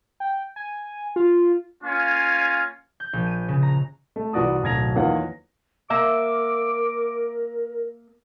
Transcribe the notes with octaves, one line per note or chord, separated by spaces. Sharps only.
G5
G#5
F4
A#3 C#4 F4 F5 G#5
G6
A#1
D#7
C#3
A#5
A3
C2 E3 F#4 D5 D#6
D1 B1 A#5 G#6 A#6 F7
E2 D#3 A#3 F4 C#5 F#5
A#3 A#4 E5 D6